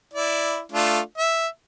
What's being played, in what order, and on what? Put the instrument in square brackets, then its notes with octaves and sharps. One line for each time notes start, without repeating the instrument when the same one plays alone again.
[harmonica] E4 D5
A3 D4 F4
E5